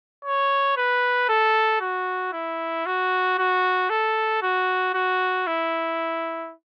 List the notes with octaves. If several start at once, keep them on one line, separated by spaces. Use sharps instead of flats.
C#5
B4
A4
F#4
E4
F#4
F#4
A4
F#4
F#4
E4